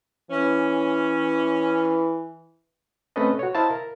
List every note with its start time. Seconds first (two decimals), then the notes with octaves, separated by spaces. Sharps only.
0.31 E3 C#4
3.16 A3 C4 C#4 A4 B4 D#5
3.39 F#4 C#5
3.55 E4 C5 D#5 F5 A5
3.70 A#4